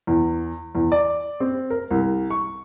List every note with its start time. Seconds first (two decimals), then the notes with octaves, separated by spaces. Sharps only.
0.07 E2
0.75 E2
0.92 D5
1.40 C4
1.70 A#4
1.91 C2
2.30 C#6